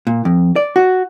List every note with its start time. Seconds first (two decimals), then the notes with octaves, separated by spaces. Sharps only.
0.07 A#2
0.25 F2
0.56 D5
0.76 F#4